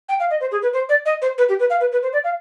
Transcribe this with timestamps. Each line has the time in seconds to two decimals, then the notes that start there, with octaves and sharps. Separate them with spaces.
0.09 G5
0.20 F5
0.30 D#5
0.40 C5
0.51 G#4
0.62 B4
0.73 C5
0.89 D5
1.05 D#5
1.21 C5
1.38 B4
1.49 G4
1.59 B4
1.70 F5
1.80 B4
1.92 B4
2.02 C5
2.13 D5
2.24 F5